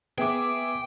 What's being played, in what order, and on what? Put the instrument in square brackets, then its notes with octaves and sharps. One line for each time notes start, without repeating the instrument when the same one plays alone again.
[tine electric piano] B3 B4 [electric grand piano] G#4 E5 D6 [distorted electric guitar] G5